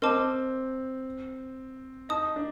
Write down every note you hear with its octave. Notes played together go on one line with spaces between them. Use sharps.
C4 A#4 D#5 A5 D6
D#4 D#5 A5 D#6
D4